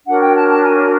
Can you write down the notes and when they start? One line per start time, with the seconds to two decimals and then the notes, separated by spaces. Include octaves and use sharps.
0.07 D4 F#4 A#4 C#5 F#5
0.21 G5
0.35 A5
0.49 A5
0.63 G#5